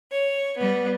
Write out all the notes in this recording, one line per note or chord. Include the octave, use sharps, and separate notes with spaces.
C#5
G3 B3